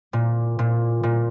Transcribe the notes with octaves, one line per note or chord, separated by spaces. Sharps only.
A#2
A#2
A#2